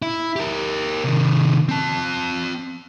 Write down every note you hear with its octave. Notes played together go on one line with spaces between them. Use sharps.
E4
G4 A#4
C3 D#3
C4 A5